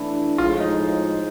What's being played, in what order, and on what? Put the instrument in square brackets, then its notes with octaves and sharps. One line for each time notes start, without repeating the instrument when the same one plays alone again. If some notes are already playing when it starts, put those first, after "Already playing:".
Already playing: [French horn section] E3 A3 D4 [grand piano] E4
[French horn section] A2 F3 G#3 [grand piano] F4
[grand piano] D#4